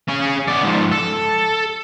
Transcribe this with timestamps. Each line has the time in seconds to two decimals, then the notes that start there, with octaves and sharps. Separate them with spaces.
0.08 C#4 G#4
0.48 B3 D5
0.63 G#2 F3
0.92 A4